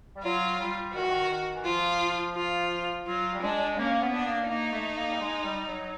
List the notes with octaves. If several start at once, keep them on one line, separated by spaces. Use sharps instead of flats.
G3
F#3 F4
G3
D#3 F#4
E3
D#3
D#3
E3
F3 F4
F4
F#3 F4
G3
G#3 D4
A#3 C#4
B3
D4
A#3
A#3 D#4
A3
A#3
G3
G#3
G3
F#3